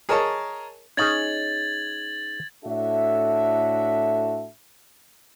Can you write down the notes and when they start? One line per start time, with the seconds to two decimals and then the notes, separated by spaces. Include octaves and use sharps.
0.09 G#4 A#4 C#5 D#5 A5 A#5
0.97 C#4 D#4 G#4 G#6 A6 F#7
2.65 A2 D4 F#4 A4 E5